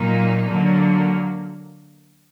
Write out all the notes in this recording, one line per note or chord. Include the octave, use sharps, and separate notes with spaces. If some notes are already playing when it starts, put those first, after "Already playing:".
Already playing: A#2 F#3 A#3 D#4
D3 F#3 A#3